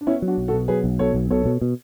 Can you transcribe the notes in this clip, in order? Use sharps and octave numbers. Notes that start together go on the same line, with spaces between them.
D4
B3 C#4 E4
F#3
D4 F#4
B1
F#4 A4
B2
F#3 G#4 B4
B1
B2 A4 C#5
B1
B2 A4 C#5
B2
B2